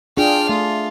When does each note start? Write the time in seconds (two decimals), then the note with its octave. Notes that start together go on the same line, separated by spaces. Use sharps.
0.17 D4 F4 G#4 G5 F6
0.49 A3 F4